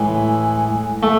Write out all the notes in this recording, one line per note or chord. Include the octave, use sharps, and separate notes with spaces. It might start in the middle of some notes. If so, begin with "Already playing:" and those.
Already playing: A2 E3 G#3
A3